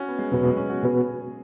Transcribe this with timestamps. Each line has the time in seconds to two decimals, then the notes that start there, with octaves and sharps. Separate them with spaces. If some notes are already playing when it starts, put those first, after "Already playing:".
Already playing: C#4 F#4
0.09 B3
0.19 G#3
0.32 E2 B2 F#3 B3 F#4 B4
0.44 G#3
0.57 C#4
0.70 F#4
0.82 B2 B3 F#4 G#4 B4